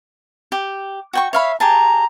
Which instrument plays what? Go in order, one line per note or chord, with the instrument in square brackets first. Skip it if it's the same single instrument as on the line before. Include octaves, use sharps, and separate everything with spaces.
[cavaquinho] G4
F#4 G5 C#6
[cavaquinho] C#5 F5 B5 [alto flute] E5
[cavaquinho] G4 G#4 A5 [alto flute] A#5